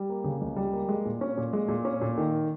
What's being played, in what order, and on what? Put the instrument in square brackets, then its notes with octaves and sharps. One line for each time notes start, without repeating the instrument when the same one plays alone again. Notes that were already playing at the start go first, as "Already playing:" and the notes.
Already playing: [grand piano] G3
A#3
C#3
C#2
G3
A#3
G#3
A#2
C#4
A#2
G#3
A#2
C#4
A#2
D#3